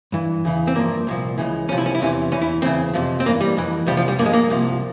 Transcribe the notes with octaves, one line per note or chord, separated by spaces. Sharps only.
G2 E3
E2 C#3 E3
C4
G2 F3 A#3
C2 A#2 F3
C#2 C#3 E3
C2 C3 F3 C#4
E4
C#4
E4
E2 C3 E3 C#4
E2 E3 C#4
E4
E2 C#3 E3 C4
F2 C3 F3
C4
G2 E3 A#3
G3
F2 E3
C2 C3 F3 G3
F3
G3
G2 F3 A#3
G#3
A#3
C2 C3 F3